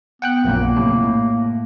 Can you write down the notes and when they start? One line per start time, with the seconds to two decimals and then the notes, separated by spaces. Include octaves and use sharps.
0.22 B3 F#5 G5 F#6
0.44 A#1 F#2 A#2 A#3
0.76 A2 C3
1.04 A2